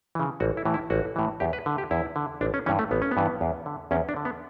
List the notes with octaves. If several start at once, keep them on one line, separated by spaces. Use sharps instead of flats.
C#3 E3
A1 F#4
E4
A2 E3
E4
A1 F#4
A2 E3
E2 G4
B4
D3
G4
E2 E4
D3
A1 D4
C#4
G2 E3 C#4
A3
A1 B3
C#4
B3
G2 E3
E2
D3
E2 C#4
D4
D3
B3